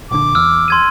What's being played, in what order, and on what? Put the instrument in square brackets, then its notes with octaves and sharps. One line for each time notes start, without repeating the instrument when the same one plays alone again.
[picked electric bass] A#1 D3 [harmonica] D6
[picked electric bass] E2 [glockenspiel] E6 F6
[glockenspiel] C6 G#6 D#7